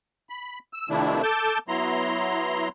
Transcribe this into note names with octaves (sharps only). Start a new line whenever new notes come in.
B5
E6
C3 D#3 F3 A3 D4 E4
A4 A5 D6 G6
F#3 B3 E4 A#5 C6